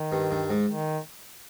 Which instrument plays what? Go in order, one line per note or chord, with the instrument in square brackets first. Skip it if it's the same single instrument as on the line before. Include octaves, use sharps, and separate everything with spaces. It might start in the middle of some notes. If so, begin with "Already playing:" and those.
Already playing: [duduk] D#3
[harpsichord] G2
G2
G#2
[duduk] D#3